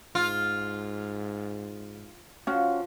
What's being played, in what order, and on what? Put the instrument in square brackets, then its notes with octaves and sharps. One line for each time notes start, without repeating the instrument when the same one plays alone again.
[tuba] G#2 [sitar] F4
[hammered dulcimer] F3 [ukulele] C#4 F#4